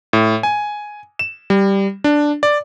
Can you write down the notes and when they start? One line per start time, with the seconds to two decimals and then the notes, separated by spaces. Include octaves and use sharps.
0.13 A2
0.43 G#5
1.19 E7
1.50 G3
2.04 D4
2.43 D5